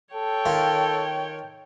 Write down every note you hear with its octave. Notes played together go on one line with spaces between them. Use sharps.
A4 C#5 G5
D#3 F4